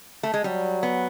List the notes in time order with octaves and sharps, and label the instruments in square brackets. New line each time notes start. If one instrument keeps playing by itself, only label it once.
[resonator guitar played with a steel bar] A3
G#3
[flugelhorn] F#3 [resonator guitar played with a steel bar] G3
[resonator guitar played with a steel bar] B3